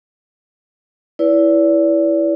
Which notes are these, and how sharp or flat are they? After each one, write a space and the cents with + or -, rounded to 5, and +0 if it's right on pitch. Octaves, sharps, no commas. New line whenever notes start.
E4 +0 B4 +0 D5 -35